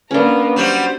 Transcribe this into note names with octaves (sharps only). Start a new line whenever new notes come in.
A#3 B3 C#4 D4 A#4
F#3 G3 F#4 C5